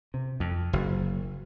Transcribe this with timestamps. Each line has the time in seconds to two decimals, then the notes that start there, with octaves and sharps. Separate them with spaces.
0.14 C3
0.40 F2
0.73 F#1